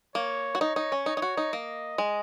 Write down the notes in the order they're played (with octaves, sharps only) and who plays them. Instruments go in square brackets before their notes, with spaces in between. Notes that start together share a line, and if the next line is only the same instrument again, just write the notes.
[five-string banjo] A#3 [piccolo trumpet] C#5
[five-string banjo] F#4
[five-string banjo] D#4 [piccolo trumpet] C#5
[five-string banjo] D#4
C#4
D#4
D#4
F#4
D#4
[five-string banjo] A#3 [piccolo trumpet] D#5
[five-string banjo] G#3